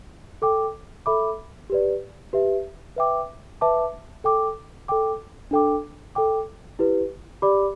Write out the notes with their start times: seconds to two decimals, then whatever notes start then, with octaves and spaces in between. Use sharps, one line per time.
0.42 A4 G5 D6
1.06 A4 E5 B5 D6
1.70 G4 B4 D5
2.33 G4 B4 E5
2.96 B4 E5 G5 D6
3.61 B4 E5 A5 D6
4.24 A4 G5 D6
4.88 A4 G5 D6
5.51 D4 A4 G5 D6
6.15 A4 G5 D6
6.79 E4 G4 B4
7.42 G4 D5 B5 D6